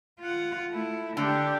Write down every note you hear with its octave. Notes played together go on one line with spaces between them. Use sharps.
F4 F#5
A3 E4
D3 D4 G4